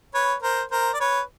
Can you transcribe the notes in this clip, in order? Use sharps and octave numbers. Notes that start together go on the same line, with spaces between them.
B4 C#5
A#4 C5
A#4 C5
D5
B4 C#5